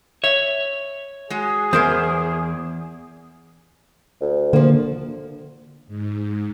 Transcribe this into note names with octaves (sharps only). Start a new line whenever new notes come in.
C#5 E5
G#3 F#4 G#4
E2 E3 A#4 C5
D2
D3 F3 A#3
G#2